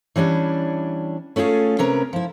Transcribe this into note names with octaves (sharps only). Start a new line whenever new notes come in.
E3 G3 C#4 D4
A3 C#4 F4 G4 G#4
C3 C#4 A#4 B4
F3 E4